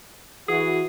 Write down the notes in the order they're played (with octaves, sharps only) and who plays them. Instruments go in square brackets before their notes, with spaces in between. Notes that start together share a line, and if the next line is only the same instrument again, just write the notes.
[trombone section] E3 F#4 [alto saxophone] G#4